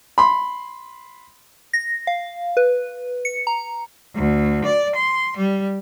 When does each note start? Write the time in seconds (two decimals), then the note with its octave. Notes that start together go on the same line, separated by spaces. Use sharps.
0.18 B5 C6
1.73 A#6
2.07 F5
2.57 B4
3.25 C#7
3.47 A#5
4.14 D2
4.64 D5
4.94 C6
5.36 G3